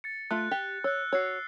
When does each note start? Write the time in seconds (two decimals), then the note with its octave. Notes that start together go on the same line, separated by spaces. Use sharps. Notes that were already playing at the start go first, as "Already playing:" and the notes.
0.04 A6 C#7
0.31 A3 F4 F#6
0.51 G4
0.84 C#5 E6 F#6
1.13 F#4 C#5 E6 C7